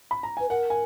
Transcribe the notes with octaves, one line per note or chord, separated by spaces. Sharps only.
B5
A#5
B4 G#5
A#4 F#5
G#5